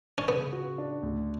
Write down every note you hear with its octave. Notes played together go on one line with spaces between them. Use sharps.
C#4
C#3 B3
F#4
D4
D2